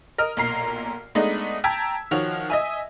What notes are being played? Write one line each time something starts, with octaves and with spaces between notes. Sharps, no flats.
A#4 D#5 F6
B1 A#2 A#5 C7
G#3 A3 B3 D4 D#4 D#5
G5 A5 A#5 E6 G#6 B6
D#3 F3 F#4 C#5 F7
D#5 E5 G#5